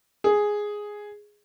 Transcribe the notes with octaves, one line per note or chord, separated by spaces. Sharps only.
G#4